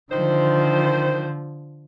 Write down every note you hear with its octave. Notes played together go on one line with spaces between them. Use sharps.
D3 D#3 F3 C5